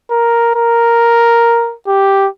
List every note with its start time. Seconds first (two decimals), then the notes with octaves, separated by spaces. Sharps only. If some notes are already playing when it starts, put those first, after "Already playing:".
0.10 A#4
0.55 A#4
1.88 G4